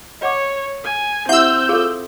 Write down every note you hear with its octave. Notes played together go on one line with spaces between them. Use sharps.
C#5 D#5 F#5 D6
G#5
C4 E4 G4 E5 F#5 E6 G6
F4 G#4 A4 F5